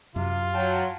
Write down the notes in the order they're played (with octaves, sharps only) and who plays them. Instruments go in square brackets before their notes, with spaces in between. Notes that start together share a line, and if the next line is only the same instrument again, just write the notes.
[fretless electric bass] F#2 [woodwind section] C3 [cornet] F4
[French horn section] F#3 [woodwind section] G5 A5